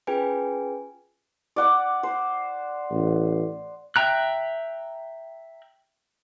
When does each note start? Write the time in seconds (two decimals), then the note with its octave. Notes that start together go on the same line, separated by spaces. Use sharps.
0.07 C#4 F4 G#4 B4 G5 G#5
1.56 D5 F#5 D6
2.03 C5
2.91 A1
3.96 E5 G5 A#5 F#6